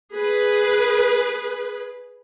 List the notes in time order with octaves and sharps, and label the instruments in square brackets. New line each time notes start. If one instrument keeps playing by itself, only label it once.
[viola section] G#4 B4